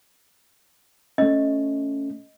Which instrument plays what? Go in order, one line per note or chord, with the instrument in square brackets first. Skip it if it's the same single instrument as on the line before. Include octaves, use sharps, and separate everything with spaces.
[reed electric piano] A3 C#4 [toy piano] D#5